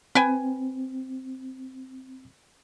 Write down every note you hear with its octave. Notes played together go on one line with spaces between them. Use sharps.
C4 B4 G5 G#5